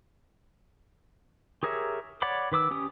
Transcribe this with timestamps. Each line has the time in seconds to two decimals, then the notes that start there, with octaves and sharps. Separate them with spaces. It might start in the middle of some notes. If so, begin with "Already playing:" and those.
1.63 G4 G#4 A#4 C#5 E5
2.22 C#5 D5 F#5 B5 D6
2.52 D#3 B4 D6 E6
2.71 C#4 G4 D#6